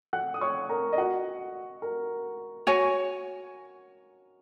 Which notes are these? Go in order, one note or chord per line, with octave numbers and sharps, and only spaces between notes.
F#5 F#6
D#6
C#5 C#6
A#4 A#5
D#5
F#4 F#5
A#4
F#4 C#5 G#5